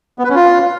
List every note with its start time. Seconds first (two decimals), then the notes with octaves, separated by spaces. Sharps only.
0.19 B3
0.24 B4
0.30 C#4
0.35 F4